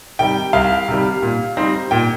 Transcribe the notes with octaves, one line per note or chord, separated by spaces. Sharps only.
C3 D#3 G3 G5
C2 F5
C3 D#3 G3
A#2
G3 C4 D#4
A#2 G5